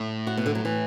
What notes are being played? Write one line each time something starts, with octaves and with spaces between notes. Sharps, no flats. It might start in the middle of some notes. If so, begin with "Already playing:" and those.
Already playing: A2
F#4
B2
D3
F#3
E3